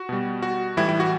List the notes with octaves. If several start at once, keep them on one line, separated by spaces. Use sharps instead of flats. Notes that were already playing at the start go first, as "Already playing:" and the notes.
Already playing: F#4
B2 G3
F#4
A2 E3 G3 E4
E4
F#4